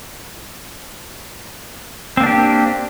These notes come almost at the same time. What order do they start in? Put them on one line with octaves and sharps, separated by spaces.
C4 A#3 D4 G4